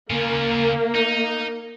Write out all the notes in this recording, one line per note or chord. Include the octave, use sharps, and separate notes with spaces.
C#3 A#3 F4
D#4